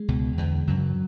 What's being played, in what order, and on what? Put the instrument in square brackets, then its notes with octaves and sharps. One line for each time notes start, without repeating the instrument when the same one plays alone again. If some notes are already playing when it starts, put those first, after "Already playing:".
Already playing: [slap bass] G#3
C#2 B2
E2 D3
F#2 C#3 F#3